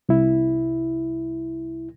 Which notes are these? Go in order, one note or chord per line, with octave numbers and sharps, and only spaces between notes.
C2 E4